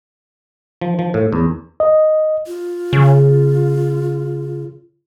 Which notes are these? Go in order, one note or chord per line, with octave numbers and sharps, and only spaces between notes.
F3
F3
A2
E2
D#5
F4
C#3